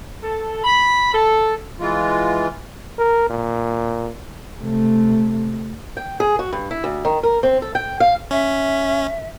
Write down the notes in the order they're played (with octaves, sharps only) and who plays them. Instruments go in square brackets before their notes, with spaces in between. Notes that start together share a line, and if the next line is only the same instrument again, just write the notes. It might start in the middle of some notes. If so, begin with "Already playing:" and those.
[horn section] A4
B5
A4
[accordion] E3 G#3 F4
[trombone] A#4
A#2
[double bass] C3 A3
[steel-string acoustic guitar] G5
G#4
F#4
G2
E4
D2
D#3
A#4
C4
A4
G5
F5
[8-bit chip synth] C#4 [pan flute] E5